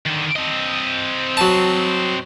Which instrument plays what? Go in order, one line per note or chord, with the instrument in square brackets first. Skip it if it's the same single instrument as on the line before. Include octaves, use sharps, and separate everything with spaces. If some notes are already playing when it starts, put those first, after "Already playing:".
[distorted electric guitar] D3 D#3
C4 D#5
[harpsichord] F#3 A5